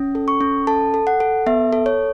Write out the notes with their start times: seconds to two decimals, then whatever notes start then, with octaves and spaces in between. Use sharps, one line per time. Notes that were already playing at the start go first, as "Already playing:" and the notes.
Already playing: C#4
0.15 A4
0.28 C#6
0.41 C#4
0.67 A4 A5
0.94 A4
1.07 F#5
1.20 A4
1.46 B3 E5
1.73 A4
1.86 C#5